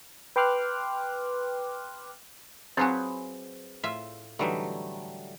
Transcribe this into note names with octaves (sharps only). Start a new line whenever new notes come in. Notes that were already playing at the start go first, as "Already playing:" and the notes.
B4 G5 C6 D6 F6 F#6
F#3 C4 F4 F#4 G#4 B4 C5 G#5
A2 F4 E5
D3 E3 F#3 G3 A3 D#4